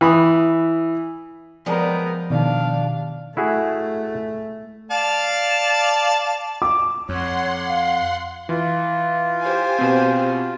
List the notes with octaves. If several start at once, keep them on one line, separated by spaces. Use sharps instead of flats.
E3 B5 D#6
F3 G3 G#3 B3 A#4
B2 D#3 D4 D5 F5
A3 E4 F#4 G#4
D5 F5 A5
D6
F2 C#5 F#5 C6
F5
E3 F4
G4 C5 G#5
B2 C4